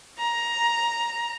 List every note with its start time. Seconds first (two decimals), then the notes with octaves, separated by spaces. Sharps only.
0.18 A#5